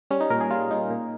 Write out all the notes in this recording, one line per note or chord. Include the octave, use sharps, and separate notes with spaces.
G3 C#4
D#4
A#2 A#4
G#4
G3 F4
A#2 D#4
A#2